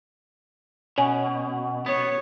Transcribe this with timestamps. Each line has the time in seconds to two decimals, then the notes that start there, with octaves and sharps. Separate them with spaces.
0.98 B2 C#4
1.86 B3 C#5